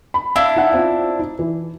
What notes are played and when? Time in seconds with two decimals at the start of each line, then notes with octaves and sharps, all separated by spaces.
0.14 B5
0.36 D4 E4 F5
0.56 D#4 F#5
0.74 C4 F4
1.19 D#4
1.39 E3